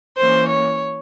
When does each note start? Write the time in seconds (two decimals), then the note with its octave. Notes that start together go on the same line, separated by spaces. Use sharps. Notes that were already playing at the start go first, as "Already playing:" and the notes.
0.18 E3 A#3 C#4 C5
0.48 C#5